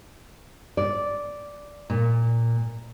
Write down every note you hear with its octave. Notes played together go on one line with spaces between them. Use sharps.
D5
A#2